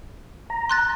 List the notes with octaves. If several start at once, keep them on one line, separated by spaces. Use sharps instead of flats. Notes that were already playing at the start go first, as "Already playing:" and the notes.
A#5
C6 F#6 A6